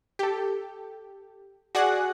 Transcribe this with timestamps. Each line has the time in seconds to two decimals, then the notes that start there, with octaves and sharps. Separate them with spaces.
0.19 G4 A4
1.75 F#4 G#4 D5 F#5